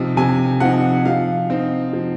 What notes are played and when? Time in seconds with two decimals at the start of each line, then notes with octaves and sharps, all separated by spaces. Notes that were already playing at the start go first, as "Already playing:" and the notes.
Already playing: C3 F3 C4 D#4
0.17 C3 G#5
0.60 F3 C4 D#4 F#5
1.05 F3 F5
1.50 C4 D#4
1.93 F3